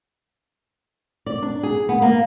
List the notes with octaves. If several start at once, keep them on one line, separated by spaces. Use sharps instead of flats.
D5
D4
G#4
B3
A#3